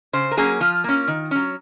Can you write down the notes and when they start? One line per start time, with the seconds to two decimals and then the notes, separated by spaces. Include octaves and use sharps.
0.13 C#3 C5
0.31 A#4
0.37 F#3 A#3 C#4 G#4
0.60 F3 F4
0.84 A#3 C#4
1.08 D#3
1.31 F#3 C#4